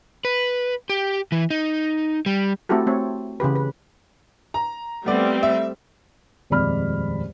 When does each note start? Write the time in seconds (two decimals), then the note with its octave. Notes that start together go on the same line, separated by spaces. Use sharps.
0.25 B4
0.90 G4
1.32 E3
1.50 D#4
2.26 G3
2.69 A3 C4 E4 F#4 G4 A4
2.86 A3 C4 C#5
3.40 C#3 E3 G4 B4
3.56 B4
4.54 A#5
5.06 G3 A3 B3 C4 D5
5.43 E5
6.50 D#1 F2 G#3 D5 B5 F6